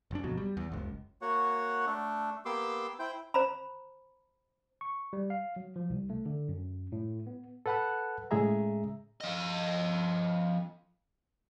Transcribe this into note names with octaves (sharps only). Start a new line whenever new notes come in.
F#1 F#2 D4
G1 F2 B2 F#3
G3
E2
F#1 C#2
A#3 F#4 C#5 F#5
A3 D4 A4
A#3 B3 G4 C6 D6 E6
E4 C5 G5
C5 A#5 B5
C#6
G3
F5
F#3
F3
C2
A3
D3
F#2
A2
B3
A4 B4 F#5 A5 B5 F#6
A2 C#3 G#3 G#4 E5 A#5
F3 D#5